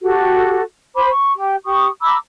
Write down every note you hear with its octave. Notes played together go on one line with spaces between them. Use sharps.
F#4 G4 A4
C5 B5 D6
C#6
G4
G4 C#6 D#6
A#5 B5 D6 E6